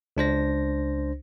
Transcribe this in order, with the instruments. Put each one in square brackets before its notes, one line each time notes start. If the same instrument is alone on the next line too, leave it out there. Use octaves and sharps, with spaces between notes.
[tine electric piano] C#2 D4 C5 A#6